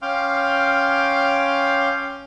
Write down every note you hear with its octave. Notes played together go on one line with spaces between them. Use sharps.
C#4 F5 G5 C6 D6 F6